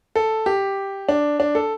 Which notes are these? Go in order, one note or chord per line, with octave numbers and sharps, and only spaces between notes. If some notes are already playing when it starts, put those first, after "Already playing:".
A4
G4
D4
D4
A4